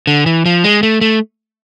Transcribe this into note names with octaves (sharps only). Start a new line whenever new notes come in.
D3
E3
F3
G#3
A3
A3